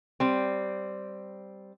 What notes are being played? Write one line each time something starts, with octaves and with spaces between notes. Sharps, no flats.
G3 C4